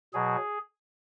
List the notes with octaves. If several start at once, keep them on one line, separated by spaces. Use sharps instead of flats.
B2 F#3 G#4